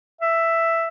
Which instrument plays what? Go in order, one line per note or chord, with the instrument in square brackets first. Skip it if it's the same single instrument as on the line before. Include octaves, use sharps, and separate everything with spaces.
[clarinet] E5